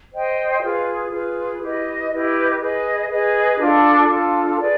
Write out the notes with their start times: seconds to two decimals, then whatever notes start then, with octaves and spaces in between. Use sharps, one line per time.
0.11 C5 D#5 G5
0.62 F4 G#4 B4
1.11 F4 G#4 B4
1.61 E4 G4 B4 D#5
2.10 E4 G4 B4 D#5
2.60 G#4 B4 D#5
3.10 G#4 B4 D#5
3.59 D4 F4 A4
4.08 D4 F4 A4
4.59 G#4 B4 D5